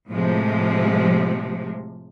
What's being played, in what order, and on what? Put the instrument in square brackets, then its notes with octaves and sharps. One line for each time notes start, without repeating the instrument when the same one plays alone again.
[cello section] A2 C3 F3 G#3